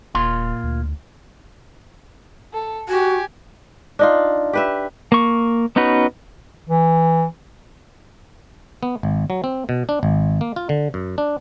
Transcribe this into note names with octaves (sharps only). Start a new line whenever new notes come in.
D#1 A#2 F4 C6
D2
A4
F#4 G4 G#5
D4 D#4 F4
G4 B4 E5
A#3 C#6
B3 C#4 D#4 F#4 B4
E3
B3
G#1
F#3
C4
B2
D4
G#1
A#3
F4
D3
F#2
D4